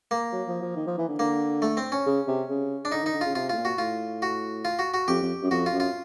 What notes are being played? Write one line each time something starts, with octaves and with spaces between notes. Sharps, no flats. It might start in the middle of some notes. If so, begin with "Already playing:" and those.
A#3
F#3
F3
F3
D#3
F3
E3
D3
D3 A#3
A3
C4
C#4
C#3
C3
C#3
D4
D3 D#4
D#3
D#4
D3
C#3 F4
C3 F4
A2 F4
A#2
F#4
A2 F4
F#4
F4
F#4
F#4
F2 G4
F2
F#2
F2 F#4
F4
F#2
F4